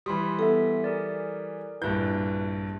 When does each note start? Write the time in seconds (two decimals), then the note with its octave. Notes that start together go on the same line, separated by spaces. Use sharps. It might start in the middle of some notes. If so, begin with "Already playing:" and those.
0.06 E3 G3 B5 C6 D#6
0.39 B3 A4 E5
0.84 G#4 A#4 D5
1.82 A#1 G2 E4 B4 G6